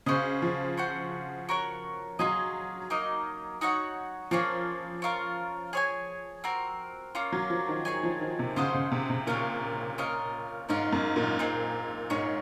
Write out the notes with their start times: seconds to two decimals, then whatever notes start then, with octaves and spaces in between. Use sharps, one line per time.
0.06 C#3 F#4 C5 D#5
0.42 F3
0.77 F#4 C5 F#5
1.49 F#4 A#4 C#5 F#5
2.19 F#3 F4 G#4 D#5
2.90 A#3 D#4 A#4 D#5
3.61 D#4 F#4 C#5 F#5
4.31 F3 A#3 C#4 F4 G#4
5.02 C#4 F4 A#4
5.73 G#4 C#5 G#5
6.44 C4 F#4 A#4
7.15 A#3 C#4 F4
7.32 F#3
7.50 F3
7.68 D#3
7.85 G#4 C#5 G#5
8.03 F3
8.21 D#3
8.39 C3
8.56 C#3 F4 C5 D#5 F#5
8.74 C#3
8.92 C3
9.10 C3
9.27 A#2 C#4 F4 A#4 F5
9.98 C#4 F4 A#4 D#5
10.69 G#2 C#4 F4 A#4 F5
10.93 F#2
11.16 A#2
11.39 C4 D#4 G#4
12.10 G#2 C#4 G#4 C#5